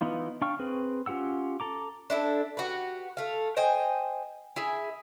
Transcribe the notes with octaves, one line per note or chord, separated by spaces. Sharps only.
E3 B3 D#4 F4
D4 F5 G5 C#6 F6
C4 G#4 B4
C#4 F4 G4 F#5 E6
A4 A#5 D6
D4 E4 A4
F#4 G4 B4
A3 F5
C5 D#5 G5 G#5
E4 G#4 E5